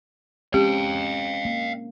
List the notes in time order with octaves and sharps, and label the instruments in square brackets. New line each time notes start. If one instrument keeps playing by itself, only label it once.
[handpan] G#3 C4 C#4 [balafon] G4 [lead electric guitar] F5 G5
[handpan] A#3